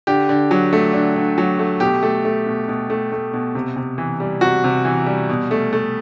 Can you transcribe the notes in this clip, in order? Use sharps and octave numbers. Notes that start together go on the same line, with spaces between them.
D3 G4
D3
F#3
A3
D3
D3
F#3
A3
B2 G4
A3
A3
B2
B2
A3
A3
B2
C3
C3
E3
G3
C3 F#4
C3
E3
G3
B2
A3
A3